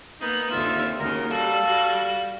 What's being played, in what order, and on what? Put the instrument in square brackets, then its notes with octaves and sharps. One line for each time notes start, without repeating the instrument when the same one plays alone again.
[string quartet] A#3 B3 [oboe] D#4
[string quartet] D#2 D3 E5 [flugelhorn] C4 [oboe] F4
[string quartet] D#2 C#3 [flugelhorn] F#4 [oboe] A#4
[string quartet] G3 F#4 [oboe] A4 [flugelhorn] F5
[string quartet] G3 F#4